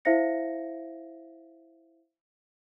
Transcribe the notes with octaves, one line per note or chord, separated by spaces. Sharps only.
E4 C5 E5 F5 A#6 C#7